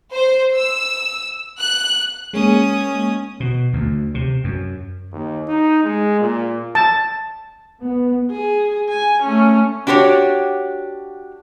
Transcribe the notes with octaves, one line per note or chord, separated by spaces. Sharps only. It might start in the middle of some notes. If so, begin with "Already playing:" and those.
C5
E6
F#6
G#3 A#3 C#4 D#6
B2
D2
C3
F#2
D#2
D#4
G#3
A#2
A5
B3
G#4
G#5
A3 C#4
D4 F#4 G4 C5 C#5